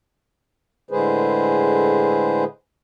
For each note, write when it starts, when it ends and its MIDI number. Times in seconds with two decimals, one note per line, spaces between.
0.91 2.44 45
0.91 2.44 50
0.91 2.44 56
0.91 2.44 68
0.91 2.44 71
0.91 2.44 72